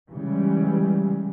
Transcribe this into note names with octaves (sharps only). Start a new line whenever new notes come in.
C#3 E3 G3 G#3